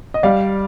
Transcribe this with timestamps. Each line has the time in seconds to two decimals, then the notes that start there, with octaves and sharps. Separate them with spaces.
0.14 D#5
0.23 G3 D5 F5